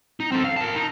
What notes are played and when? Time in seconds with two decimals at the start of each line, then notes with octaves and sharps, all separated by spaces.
0.20 D#4
0.32 C4 A4
0.44 F5
0.56 A#4 A5
0.76 D#4